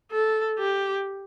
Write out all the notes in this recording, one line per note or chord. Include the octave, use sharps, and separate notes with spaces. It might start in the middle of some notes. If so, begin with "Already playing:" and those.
A4
G4